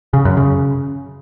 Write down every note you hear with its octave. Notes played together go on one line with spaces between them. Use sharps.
C#3
F#2
C#3